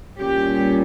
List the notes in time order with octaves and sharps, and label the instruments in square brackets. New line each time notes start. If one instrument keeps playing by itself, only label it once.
[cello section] A#2 G3 C#4 G4